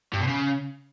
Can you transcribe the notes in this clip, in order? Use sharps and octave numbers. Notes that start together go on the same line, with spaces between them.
G2
B2
C#3